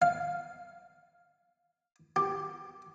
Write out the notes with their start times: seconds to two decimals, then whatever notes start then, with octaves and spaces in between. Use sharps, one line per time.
0.02 F5
2.16 G4